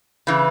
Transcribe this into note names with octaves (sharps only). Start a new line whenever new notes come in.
C#3 E3